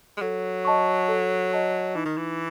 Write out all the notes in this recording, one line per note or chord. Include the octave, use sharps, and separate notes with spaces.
G#3
F#3 A4
D#5 A5 C#6
A4
D#5 A5 C#6
E3 D#4
D#3
E3